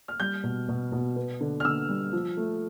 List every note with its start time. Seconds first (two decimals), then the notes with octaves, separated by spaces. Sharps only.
0.08 F6
0.20 G3 G6
0.44 B2
0.69 B2
0.92 B2
1.16 B3
1.41 D3
1.60 F6
1.64 D3 E6
1.89 G3
2.13 F3
2.37 A3